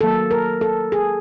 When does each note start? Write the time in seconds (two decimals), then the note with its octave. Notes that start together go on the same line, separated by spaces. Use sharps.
0.01 D#3 F#3 A#3 A4
0.31 A#4
0.61 A4
0.92 G#4